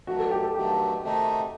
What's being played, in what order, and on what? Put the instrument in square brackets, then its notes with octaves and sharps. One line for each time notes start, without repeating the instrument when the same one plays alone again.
[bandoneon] G2 D#3 F#3 A3 [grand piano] F#4
[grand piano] A4
G4
A4
[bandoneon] G2 D#3 F#3 A3 [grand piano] G4
[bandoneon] C3 D#3 A3 D#4